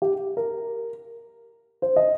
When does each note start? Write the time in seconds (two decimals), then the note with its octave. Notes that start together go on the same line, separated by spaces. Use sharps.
0.02 G4
0.37 A#4
1.82 C5
1.96 D#5